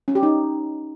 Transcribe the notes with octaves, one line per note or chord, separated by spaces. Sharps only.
C#4
G4
D#4